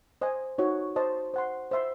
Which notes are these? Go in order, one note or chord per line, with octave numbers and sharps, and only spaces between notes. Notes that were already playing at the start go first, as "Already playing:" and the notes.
C5 D#5 G#5
D#4 F#4 C#5
C5 D#5 A5
C5 F#5 C6
C5 E5 C6